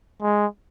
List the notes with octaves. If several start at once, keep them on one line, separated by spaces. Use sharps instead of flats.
G#3